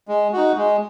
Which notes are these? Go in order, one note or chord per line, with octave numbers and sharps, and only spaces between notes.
G#3
D#4 F#4
G#3